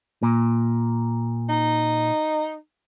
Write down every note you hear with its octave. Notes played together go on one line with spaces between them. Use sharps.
A#2
D#4